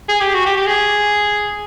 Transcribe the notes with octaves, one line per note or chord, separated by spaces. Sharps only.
G#4
G4
F#4
G4
G4
G#4